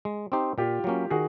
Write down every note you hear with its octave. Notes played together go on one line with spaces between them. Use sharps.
G#3
C4 D#4 G4 C5
A#2 F4 G4
F#3 A#3 C#4
D#3 F#4 G#4